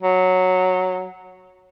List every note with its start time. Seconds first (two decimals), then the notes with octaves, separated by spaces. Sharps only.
0.03 F#3